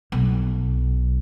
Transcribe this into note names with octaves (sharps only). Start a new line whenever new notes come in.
B1